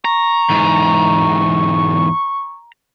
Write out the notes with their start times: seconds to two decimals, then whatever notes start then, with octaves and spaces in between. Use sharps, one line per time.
0.05 A#5 C#6
0.50 E2 G#2